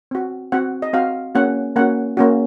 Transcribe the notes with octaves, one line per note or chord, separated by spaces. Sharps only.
C4 F#4
C4 F#4 F#5
D#5
C4 F#4 F5
A#3 C#4 F#4 F#5
A#3 C#4 F#4 F#5
A#3 C#4 F#4